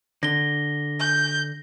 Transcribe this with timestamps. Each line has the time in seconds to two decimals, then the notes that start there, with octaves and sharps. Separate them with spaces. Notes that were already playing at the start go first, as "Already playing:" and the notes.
0.23 D3 A#6 G7
1.00 G6